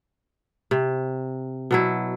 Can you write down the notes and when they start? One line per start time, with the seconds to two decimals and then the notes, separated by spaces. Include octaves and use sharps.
0.71 C3
1.71 B2 F#3 E4